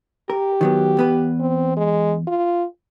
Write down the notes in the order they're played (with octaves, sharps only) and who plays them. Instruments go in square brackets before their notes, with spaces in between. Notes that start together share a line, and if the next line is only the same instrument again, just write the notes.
[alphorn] G4 [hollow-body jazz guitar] A#4
[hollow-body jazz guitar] D#3 F#3 B3
E2 B3 B4
[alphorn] C4
G#3
F4